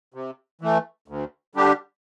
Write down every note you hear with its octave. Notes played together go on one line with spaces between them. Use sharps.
C3
E3 A3
D2
D3 G3 D4 G4